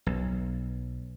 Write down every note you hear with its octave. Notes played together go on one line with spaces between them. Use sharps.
B1